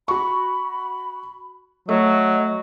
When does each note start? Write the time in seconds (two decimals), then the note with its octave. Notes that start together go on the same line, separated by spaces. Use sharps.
0.08 F#4 B5 C#6
1.89 F#3 A3 D#5